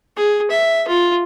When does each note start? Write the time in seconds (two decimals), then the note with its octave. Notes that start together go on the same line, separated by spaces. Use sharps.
0.16 G#4
0.51 E5
0.88 F4